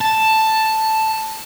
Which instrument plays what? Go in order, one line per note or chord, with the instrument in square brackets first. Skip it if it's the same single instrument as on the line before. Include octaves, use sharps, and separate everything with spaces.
[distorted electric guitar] A5